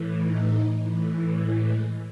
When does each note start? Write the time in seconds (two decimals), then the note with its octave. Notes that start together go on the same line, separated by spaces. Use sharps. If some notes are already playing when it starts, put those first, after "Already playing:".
Already playing: A2 E3
0.21 D#4
0.79 A2 E3
1.37 G#3
1.66 G#3